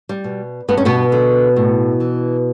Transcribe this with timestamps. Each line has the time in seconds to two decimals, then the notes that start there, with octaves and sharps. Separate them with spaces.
0.09 G3
0.24 B2
0.68 G2 B3
0.77 C#4
0.85 B2 B3
1.12 D3
1.56 A2
2.00 E3